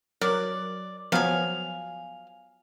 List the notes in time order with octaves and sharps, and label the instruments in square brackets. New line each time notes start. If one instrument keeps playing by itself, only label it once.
[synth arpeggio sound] F#3 A#4 F#6 [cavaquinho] D5
[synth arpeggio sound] F3 F#3 B3 [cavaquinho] F5 G#5